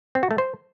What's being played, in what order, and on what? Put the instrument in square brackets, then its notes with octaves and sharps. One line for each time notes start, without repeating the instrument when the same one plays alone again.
[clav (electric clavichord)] C4
F#4
A3
C5